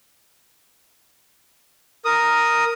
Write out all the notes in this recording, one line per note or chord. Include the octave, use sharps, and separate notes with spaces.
A#4 D#6